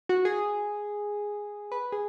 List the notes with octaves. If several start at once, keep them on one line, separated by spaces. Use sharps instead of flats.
F#4
G#4
B4
G#4